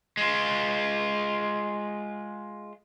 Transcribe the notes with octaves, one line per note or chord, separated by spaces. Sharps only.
G#3 F4